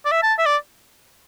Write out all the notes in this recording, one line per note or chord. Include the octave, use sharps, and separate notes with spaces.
D5
E5
A5
E5
D5